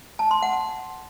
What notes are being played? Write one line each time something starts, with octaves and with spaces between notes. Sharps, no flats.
A5
C6
F#5